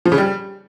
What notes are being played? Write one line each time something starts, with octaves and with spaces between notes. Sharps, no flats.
F3
C#3
G3